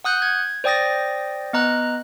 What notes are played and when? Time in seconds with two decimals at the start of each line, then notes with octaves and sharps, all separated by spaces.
0.04 F#5 D#6 F#6 G6
0.22 G#6
0.64 C5 D5 G5 D#6 A6 A#6
1.53 B3 D#5 A#5 F#6